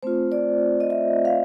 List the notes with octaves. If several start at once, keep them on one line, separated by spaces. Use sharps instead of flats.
A3 C4 F4 C5
D5
D#5
E5
F5